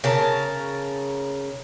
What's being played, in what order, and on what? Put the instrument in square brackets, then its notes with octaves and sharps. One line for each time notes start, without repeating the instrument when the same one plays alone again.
[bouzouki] C#3 A#4 A5